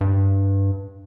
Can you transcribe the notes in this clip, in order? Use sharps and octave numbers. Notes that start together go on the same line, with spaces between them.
G2